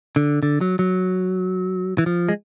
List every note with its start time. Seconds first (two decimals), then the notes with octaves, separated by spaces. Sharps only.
0.16 D3
0.43 D3
0.61 F#3
0.79 F#3
1.98 E3
2.06 F3
2.29 G#3